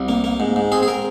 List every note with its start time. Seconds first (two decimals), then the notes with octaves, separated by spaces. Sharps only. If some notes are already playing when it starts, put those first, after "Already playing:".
Already playing: C2
0.09 A#3
0.24 A#3
0.40 G#2
0.56 G#2
0.72 C4 G#4
0.83 G#4
0.88 A#4